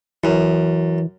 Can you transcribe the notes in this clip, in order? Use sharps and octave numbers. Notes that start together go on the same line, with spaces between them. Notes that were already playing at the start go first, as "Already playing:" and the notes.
F#2 E3